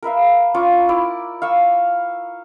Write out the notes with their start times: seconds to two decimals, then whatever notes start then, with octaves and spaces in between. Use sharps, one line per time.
0.03 A#4 B4 E5 F5
0.54 C#4 F4 C#6 D6
0.89 E4 D5
1.42 F5 C#6 E6